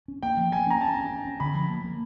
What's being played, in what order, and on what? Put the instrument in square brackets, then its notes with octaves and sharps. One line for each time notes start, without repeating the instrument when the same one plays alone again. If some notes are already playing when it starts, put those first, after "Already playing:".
[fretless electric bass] C#4
[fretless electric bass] A#3 [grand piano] G5
[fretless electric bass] F3
[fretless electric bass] A#3 [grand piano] G#5
[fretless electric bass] C#4 [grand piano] A#5
[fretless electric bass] C#4 [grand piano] A5
[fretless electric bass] C#4
C#4
C#4
[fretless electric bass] D3 [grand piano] B5
[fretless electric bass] F3
A#3
A#3